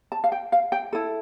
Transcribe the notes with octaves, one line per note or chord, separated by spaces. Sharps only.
A5
F5
G5
F5
G5
E4 A4